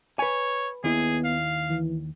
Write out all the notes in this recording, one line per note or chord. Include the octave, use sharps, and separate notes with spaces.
B4 C#5 G#5
D#2 B3 E4 G#4
F5
E3